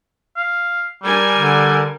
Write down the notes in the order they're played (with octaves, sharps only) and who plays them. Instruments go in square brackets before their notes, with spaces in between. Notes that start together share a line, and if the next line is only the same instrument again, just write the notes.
[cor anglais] F5
[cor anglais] G3 [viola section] D4 A#4 G#5
[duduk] D3